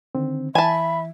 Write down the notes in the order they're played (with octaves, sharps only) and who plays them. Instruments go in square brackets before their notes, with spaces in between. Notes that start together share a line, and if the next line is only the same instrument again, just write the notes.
[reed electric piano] D3 D#3 C4
[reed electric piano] E3 [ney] E5 [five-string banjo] G#5 A5 [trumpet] B5